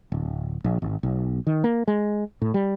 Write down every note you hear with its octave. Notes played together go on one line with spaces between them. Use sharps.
D1
A#1
G#1
B1
D#3
A#3
G#3
A2
G3